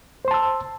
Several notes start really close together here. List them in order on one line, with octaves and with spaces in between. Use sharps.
C5 C6 A5 E6